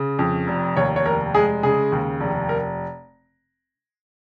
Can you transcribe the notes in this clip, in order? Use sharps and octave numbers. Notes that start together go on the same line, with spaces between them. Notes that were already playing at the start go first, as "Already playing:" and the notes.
Already playing: C#3
F2
F1
D#2 C#5
C#5
F1 A#4
G#3 G#4
C#3 G#4
D#2
F1
A#4